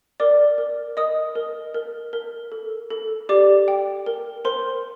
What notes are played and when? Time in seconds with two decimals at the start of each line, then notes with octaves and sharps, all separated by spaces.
0.20 A#4 D5 D6
0.58 A#4
0.97 A#4 D#5 D#6
1.36 A#4
1.74 A#4
2.13 A#4
2.52 A4
2.90 A4
3.29 G4 D5 D6
3.68 G5
4.06 A#4
4.45 A#4 C5 C6